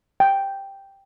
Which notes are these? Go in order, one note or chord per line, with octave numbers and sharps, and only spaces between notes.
G5